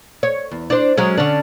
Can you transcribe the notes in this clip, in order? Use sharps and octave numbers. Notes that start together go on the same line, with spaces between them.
C#5
E2
D4 C5
F#3 G#3 C#4
D3 C#4 D4